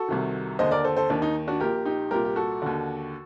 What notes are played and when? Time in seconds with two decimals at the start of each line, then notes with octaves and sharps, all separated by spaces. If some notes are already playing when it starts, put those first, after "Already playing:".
Already playing: F#4 A4
0.08 C2 C3 D#3
0.59 D#2 D3 C5 D#5
0.71 A#4 D5
0.84 A4 C5
0.96 A4 C5
1.10 D#2 D#3 D4
1.22 D#4
1.48 D4 F#4
1.60 A#1 A#2 G4 A#4
1.85 D#4 G4
2.11 C2 A#2 G4 A#4
2.25 G4
2.36 F#4 A4
2.62 D#2 D3